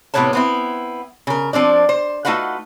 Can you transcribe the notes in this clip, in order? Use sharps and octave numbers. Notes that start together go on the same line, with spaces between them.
A2 C3 B3 B4 C#5 A5
B3 C4 E4
C#3 A#4
F3 C4 D4 D5
C5
A3 D#4 F4 F#4 B4 F#5